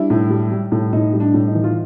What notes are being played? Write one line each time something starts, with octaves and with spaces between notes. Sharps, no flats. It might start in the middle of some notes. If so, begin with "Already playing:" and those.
Already playing: G3 D4 E4
A2
G3
G3
A2
A2 D#4
G3
D4
A2
D#4
E3
F4